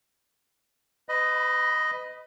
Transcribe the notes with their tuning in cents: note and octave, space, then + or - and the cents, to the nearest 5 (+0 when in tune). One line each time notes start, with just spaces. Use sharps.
B4 +40 D#5 +0 B5 +0